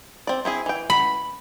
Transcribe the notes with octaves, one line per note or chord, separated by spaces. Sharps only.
C4 D5
C4 E4 G#4
E3 G5
B5